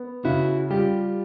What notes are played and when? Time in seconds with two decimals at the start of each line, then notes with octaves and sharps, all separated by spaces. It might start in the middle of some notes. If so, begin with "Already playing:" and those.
Already playing: B3
0.25 C#3 E4 F#4
0.70 G3 F4 G4